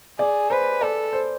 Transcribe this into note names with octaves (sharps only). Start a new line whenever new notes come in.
G#4 D5
B4 C5
A4 D5
C5